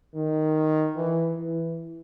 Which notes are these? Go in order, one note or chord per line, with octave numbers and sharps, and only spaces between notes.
D#3
E3
E3